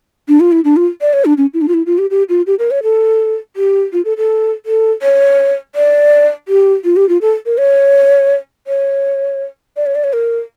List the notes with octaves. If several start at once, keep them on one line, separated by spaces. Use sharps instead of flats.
D4
F4
E4
D4
F4
D5
C#5
D4
C#4
E4
D4
F4
E4
F4
G4
G4
F4
G4
A#4
C#5
A4
G4
F4
A4
A4
A4
C#5
D5
G4
F4
G4
F4
A4
A#4
C#5
C#5
D5
C#5
D5
C#5
A#4